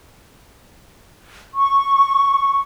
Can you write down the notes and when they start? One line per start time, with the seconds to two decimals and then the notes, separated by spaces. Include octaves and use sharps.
1.54 C#6